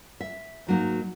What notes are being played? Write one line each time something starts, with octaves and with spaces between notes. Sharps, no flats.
E5
G#2 F#3 A#3 D#4